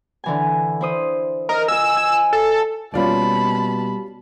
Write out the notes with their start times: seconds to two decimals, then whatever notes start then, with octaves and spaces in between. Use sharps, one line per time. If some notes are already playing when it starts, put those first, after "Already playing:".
0.24 D3 E3 G#5
0.81 E4 C5 D#6
1.49 A#4 D#5
1.68 F4 G#5 E6
1.96 G#5
2.33 A4
2.94 B2 G3 A#3 C#4 F4 D5 A5 B5